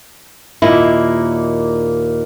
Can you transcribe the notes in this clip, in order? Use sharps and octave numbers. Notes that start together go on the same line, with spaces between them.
D#2 A#2 A#3 D#4 E4